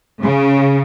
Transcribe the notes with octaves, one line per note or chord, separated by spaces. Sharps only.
C#3